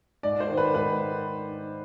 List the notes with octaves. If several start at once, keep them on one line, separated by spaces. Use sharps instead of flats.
G#2 D5
C5
D#3
B4
G#2 B4